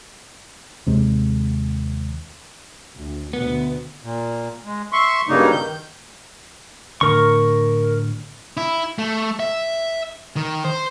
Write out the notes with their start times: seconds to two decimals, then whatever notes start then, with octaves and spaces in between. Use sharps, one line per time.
0.86 D#2 C3 G#3
2.95 D2
3.33 D2 B2 B3
4.03 A#2
4.65 G#3
4.92 E5 C6 C#6
5.28 G2 C#3 F#3 G3 A#3 D#4
5.52 D#3 G6
7.01 A2 D3 A#4 C#6
8.57 E4
8.98 A3
9.40 E5
10.36 D#3
10.65 C5